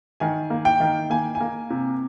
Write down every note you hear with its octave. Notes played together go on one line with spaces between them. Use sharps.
D#3 G#5
A#3
G5
D#3
A#3 G#5
G#5
A#3
C3